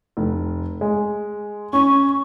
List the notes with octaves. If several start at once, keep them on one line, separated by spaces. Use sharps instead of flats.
F1
G#3
C#4 C#6